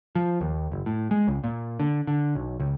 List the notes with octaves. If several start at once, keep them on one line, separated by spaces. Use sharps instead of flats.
F3
D#2
F#1
A2
G#3
C#2
A#2
D3
D3
B1
C#2